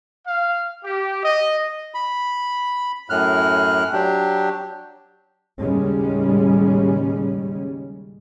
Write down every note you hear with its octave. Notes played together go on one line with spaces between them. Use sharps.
F5
G4
D#5
B5
F#2 A2 F6 F#6
F#3 D4 G4
D#2 A2 C#3 G3 G#3 C#4